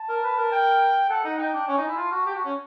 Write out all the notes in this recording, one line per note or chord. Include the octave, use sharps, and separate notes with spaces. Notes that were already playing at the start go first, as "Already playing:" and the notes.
Already playing: A5
A#4
B4
A#4
G5
A4 F#5
D#4
D#4 G5
D4
C#4 G#5
D#4
E4
F4 A5
F#4
G4
F#4
C#4